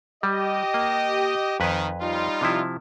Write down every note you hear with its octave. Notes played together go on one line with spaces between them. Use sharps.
G3 G4 D#5
A#3
F2 D#3 B4 G#5
G3 D#4 F4
C3 F3 E4